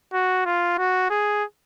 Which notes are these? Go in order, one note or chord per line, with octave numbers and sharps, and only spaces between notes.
F#4
F4
F#4
G#4